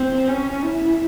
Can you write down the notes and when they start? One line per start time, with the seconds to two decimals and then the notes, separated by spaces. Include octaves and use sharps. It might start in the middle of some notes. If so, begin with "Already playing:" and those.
Already playing: C4
0.28 C#4
0.62 E4